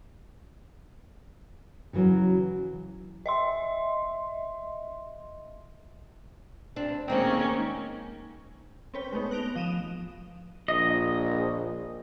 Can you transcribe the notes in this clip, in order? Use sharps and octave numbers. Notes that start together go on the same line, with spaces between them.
C#3 E3 F#3 C#4
D#5 E5 C6
C4 D4
D#2 G#3 A#3 C4 C#4 D#4
C4 C#4 B4 C#5 G5
G#3 A3 B3 D#4
F#6 A#6 D7 F7 G7
F3 D#6 D#7 E7
A#1 D#5